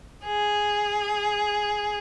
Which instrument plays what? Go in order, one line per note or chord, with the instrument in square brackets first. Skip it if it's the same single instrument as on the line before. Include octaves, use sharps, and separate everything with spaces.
[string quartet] G#4